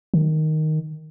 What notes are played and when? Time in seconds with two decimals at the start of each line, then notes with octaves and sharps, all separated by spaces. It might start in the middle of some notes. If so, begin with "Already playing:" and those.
0.14 D#3